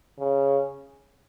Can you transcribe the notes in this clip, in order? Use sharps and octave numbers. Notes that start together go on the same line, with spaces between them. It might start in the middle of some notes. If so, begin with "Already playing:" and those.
C#3